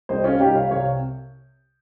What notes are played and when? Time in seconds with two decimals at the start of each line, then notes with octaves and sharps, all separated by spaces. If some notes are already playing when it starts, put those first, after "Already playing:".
0.09 C2 C3 G3 C5 D#5
0.24 C#4 F4
0.40 C2 C3 G3 D#4 G4
0.55 C#5 F5
0.70 C2 C3 G3 C#5 F5